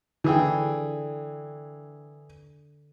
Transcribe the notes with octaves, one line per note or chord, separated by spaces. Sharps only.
D3 E3 G#4 G5